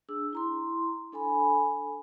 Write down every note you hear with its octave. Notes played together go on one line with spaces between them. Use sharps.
D4 G#4 E6
E4 A#5 C6
D4 A4 G#5 B5